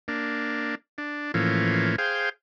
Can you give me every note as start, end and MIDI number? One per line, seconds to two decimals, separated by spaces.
0.08 0.75 58
0.08 0.75 62
0.98 1.32 62
1.34 1.96 45
1.34 1.96 52
1.34 1.96 53
1.34 1.96 58
1.34 1.96 61
1.98 2.29 68
1.98 2.29 72
1.98 2.29 77
1.98 2.29 79